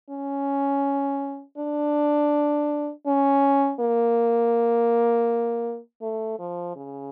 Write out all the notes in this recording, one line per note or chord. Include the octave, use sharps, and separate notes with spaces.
C#4
D4
C#4
A#3
A3
F3
C#3